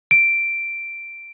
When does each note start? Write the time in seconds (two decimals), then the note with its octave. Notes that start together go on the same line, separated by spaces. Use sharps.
0.11 D7